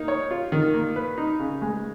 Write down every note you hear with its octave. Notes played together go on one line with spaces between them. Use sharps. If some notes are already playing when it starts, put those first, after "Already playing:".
Already playing: A#3 D#4
C#5
F4
D#3
A#3
B4
D#4
C#3
G#3